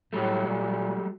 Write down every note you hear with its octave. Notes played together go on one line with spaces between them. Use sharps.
A2 F#3 G3 A3
A#2